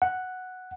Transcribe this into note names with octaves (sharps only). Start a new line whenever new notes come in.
F#5